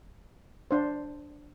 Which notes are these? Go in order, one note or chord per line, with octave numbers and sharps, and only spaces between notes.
D4 C5